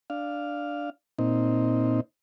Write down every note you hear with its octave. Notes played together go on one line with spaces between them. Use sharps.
D4 F5
A#2 C4 D#4